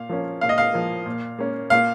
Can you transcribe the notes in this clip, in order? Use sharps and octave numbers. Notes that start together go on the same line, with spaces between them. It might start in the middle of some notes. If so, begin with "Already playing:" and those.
Already playing: A#2 F5
F3 A#3 C#4
A#2 F5
D#5
F5
F3 A#3
A#2
A#3 C#4
A#2 F5